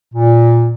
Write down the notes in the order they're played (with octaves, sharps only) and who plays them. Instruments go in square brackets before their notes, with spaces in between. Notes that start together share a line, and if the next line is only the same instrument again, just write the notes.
[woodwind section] A#2